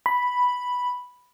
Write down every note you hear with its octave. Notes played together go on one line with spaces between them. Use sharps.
B5